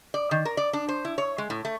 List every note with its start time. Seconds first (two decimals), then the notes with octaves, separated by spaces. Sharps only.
0.14 D5
0.31 D#3
0.45 A#4
0.57 D5
0.73 D4
0.89 C5
1.05 E4
1.18 C#5
1.38 G#3
1.50 A2
1.65 A3